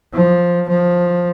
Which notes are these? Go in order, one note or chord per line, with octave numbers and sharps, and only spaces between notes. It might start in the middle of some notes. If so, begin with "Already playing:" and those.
F3
F3